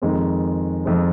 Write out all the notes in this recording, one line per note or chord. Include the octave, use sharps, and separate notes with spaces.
F2 D#3 G#3 C4
F2 D#3 G#3 C4